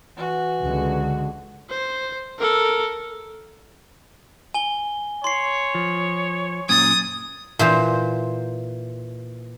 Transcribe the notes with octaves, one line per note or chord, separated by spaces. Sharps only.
E3 F#4
C#2 D3 G#3
C5
A4 A#4
G#5 G7
C#5 C6 C7
F3
F#2 A#2 D#6 G#6 A6
A#2 E3 C5